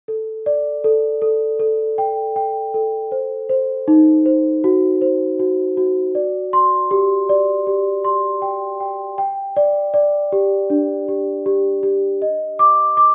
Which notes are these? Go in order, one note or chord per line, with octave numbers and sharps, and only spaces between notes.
A4
D5
A4
A4
A4
G5
G5
A4
C5
C5
D#4
C5
F#4
C5
F#4
F#4
D5
C6
G4
D5
G4
C6
G5
G5
G5
D5
D5
G4
D4
G4
G4
G4
D#5
D6
D6